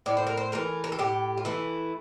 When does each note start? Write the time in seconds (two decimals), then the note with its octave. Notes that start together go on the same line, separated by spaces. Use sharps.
0.06 A2 D5
0.17 C5
0.27 A#4
0.37 C5
0.52 E3 A3 A#4
0.84 A#4
0.92 A4
0.99 A2 G4
1.37 F4
1.45 E3 A3 E4